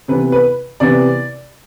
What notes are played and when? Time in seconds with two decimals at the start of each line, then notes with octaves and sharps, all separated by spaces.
0.08 C3 E3 B3 B4
0.32 B4
0.80 C3 E3 B3 D5